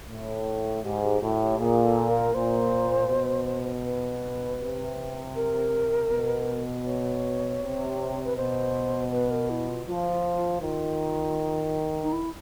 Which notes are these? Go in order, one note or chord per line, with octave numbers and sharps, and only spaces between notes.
A2
G#2 G4
G4
A2 F#4
G4
A#2 G#4
A4
A#4
A#2 C5
B2
B4
C3
A#4
B2
C#5
C3
B4
B2 C5
B4
A#4
E4
F4
F3 F4
F4
F4
D#3 F4
D#4
E4